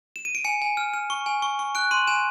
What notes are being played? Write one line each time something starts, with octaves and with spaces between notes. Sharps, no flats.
E7
D#7
D7
G#5 C#7
G#5
F6
F6
C#6
G#5
C#6
C#6
F#6 D7
C6 D#7
G#5 E7